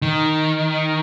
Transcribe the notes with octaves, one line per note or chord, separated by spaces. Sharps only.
D#3